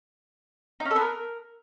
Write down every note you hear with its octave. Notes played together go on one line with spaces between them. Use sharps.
D#4
C#4
A4
B3
A#4